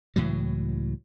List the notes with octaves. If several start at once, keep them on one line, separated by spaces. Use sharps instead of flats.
C#2 A2 E3 F#3